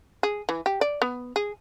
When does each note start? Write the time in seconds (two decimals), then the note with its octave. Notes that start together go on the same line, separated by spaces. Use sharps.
0.23 G#4
0.49 E3
0.66 G4
0.81 D5
1.02 B3
1.36 G#4